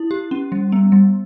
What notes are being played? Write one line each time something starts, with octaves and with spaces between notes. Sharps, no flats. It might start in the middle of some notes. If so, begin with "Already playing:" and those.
Already playing: E4
G4
C#4
G3
B3
G3